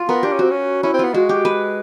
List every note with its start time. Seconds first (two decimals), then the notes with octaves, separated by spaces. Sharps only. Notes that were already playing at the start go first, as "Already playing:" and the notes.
Already playing: F4
0.09 B3 A#4
0.23 D4 G4
0.32 C#4
0.39 C4 F#4
0.51 C#4
0.83 C#4 E4
0.94 C4
0.99 F4
1.04 B3
1.14 G#3 F#4
1.29 G4
1.45 B4